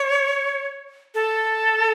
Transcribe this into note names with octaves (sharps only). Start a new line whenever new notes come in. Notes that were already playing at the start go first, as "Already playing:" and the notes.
Already playing: C#5
A4